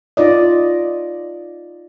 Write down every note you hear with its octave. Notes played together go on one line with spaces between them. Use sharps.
D#4 F4 D5 D#5